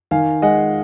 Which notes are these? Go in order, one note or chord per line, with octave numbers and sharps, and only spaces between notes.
D#3 F5 G#5
G#3 D#5 F#5